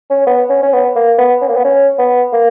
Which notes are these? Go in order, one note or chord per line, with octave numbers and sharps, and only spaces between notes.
C#4
B3
C#4
C#4
B3
A#3
B3
C#4
A#3
B3
C#4
B3
A#3